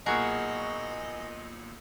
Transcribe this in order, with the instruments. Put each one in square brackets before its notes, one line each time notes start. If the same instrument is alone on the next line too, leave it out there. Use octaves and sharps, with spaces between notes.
[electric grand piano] B1 A#2 [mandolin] F#4 G#4 A#4 [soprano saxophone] D#5